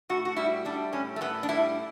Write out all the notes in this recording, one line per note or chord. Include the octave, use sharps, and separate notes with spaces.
A2 F#4
F#4
G3 E4
G3 D4
A2 C#4
A3
A2 B3
D4
G3 E4